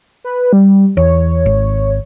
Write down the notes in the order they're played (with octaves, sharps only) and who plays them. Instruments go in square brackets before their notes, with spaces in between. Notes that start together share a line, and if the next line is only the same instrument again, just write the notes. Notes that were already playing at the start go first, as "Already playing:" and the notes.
[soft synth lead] B4
G3
[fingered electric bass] E2 [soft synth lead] C#5
[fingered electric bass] G#1